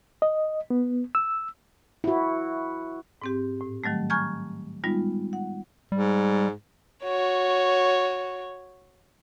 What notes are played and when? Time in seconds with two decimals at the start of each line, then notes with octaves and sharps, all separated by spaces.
0.22 D#5
0.70 B3
1.15 E6
2.04 E4 F#4
3.22 G#2 C4 G4
3.61 A2
3.84 D#3 F#3 G3 A3
4.10 G#5 A#5 C#6 F6 G6 G#6
4.84 G3 G#3 B3 D#4 F4
5.33 F#5
5.92 G#2 G3
7.03 F#4 C#5